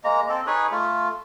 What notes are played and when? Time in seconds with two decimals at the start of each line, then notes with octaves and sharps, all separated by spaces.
0.04 G#3 A#3 A#5
0.29 C4 A4
0.47 D#4 G#4 B4 C#5
0.71 A3 F4